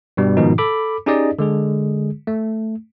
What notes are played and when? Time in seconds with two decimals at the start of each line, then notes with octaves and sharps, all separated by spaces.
0.17 G2 B2 G3
0.37 G#2 B2 D#3 F3 D#4
0.58 A4 B5 D6
1.06 C#4 D#4 G4 G#4 D5 D#5
1.39 D3 G#3 G#4
2.27 A3